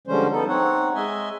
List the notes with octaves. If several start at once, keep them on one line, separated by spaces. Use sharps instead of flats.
D3 F3 G3 G#3 C#4 C5
B3 D#4 A4
C4 D#4 C#5 F#5
G#3 D#5 E5 G#5